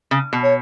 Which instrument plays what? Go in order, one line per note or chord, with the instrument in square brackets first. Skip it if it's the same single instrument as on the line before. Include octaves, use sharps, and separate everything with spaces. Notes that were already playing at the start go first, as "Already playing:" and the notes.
[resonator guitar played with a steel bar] C#3
B2
[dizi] C#5